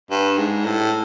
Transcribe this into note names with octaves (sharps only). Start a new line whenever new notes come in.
G2
G#2
A2